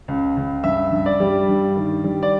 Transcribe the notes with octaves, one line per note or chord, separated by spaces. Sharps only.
C#2
C#2
G2 E5
G2
D5
G3
G2
D#3
G3
D5